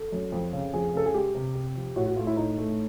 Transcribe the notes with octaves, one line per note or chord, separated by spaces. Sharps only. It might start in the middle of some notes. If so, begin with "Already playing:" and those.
Already playing: A4
F#2
F2
C#3
F2 G#4
C#3 A4
G#4
G#3 G4
C3
C3
F3
A2 F#4
F#4
A3 F4
E4
A2 D#4
A3